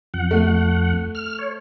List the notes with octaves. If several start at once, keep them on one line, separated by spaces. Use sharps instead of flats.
F2 F#5
A3
F6
C#5